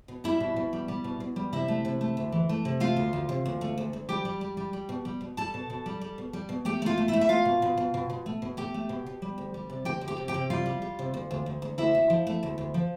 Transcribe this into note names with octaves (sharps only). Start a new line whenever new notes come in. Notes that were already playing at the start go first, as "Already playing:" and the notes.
B2
G3 E4 E5
B2
B2
G3
G3
B2
B2
G3
C3 E4 E5
A3
C3
A3
D2
E3
A3
C3
A3 F4 F5
D2
D2
C3
D2
A3
D2
D2
G3 G4 G5
G3
G3
G3
G3
B2
G3
B2
G3 A4 A5
B2
B2
G3
G3
B2
G3
B2
A3 G4 G5
A3 F4 F5
A3
E4 E5
A3
E5
A3 F4 F5
B2
B2
B2
B2
B2
A3
B2
A3 G4 G5
A3
B2
B2
G3
D2
G3
C3
D2 G4 G5
D2
G4 G5
C3
G4 G5
C3
G3 F4 F5
G3
G3
C3
D2
D2
D2
D2
D2 E4 E5
D2
F3
A3
D2
D2
F3